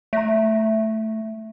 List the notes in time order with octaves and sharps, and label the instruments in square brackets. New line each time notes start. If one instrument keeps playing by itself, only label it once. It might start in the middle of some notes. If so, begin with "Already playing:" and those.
[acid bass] A3 [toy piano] E5 A#5